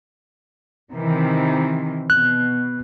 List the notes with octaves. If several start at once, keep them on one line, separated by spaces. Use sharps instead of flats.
C3 D#3 E3
B2 F#6